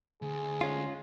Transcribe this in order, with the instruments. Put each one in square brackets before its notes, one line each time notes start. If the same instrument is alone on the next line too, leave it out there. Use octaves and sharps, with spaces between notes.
[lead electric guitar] D2 [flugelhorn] G#4
[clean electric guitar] G#3 C#4 F4